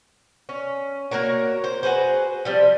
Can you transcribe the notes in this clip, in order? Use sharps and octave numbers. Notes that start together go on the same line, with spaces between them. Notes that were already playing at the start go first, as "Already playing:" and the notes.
C#4
A#3 F#4 A#4 C#5
C5
F#4 G#4 B4 C5
F3 G3 C4